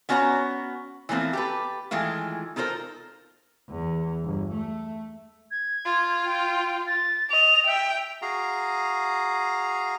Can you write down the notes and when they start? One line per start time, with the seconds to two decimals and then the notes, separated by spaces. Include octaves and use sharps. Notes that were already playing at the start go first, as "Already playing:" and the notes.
0.09 B3 C#4 F#4 C#5 F#5 A#5
1.09 E3 F3 A3 A#3 C4
1.33 G4 A4 B4
1.91 D#3 E3 G#3 A3 F4
2.56 D#4 F4 A4 A#4 C5
3.69 E2
4.24 G1
4.53 A3
5.51 G#6
5.85 F4
6.25 G5
6.87 A6
7.30 D#5 F7
7.66 E5 G5
8.22 F#4 G#4 F5 A#5